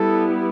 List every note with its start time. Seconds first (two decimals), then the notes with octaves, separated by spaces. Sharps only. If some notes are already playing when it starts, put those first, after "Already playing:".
Already playing: G3 B3 E4 A4